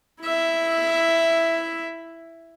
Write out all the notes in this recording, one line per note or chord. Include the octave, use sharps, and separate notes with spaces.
E4 E5